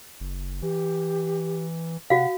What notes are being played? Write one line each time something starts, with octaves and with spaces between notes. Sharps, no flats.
F#1
E3 G4
C3 F#4 F5 F#5